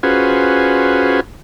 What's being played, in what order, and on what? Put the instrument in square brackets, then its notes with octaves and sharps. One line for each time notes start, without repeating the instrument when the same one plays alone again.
[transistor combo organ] C#4 F4 F#4 G#4 B4 C5